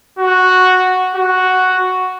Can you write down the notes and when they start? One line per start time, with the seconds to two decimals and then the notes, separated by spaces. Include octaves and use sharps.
0.19 F#4
1.16 F#4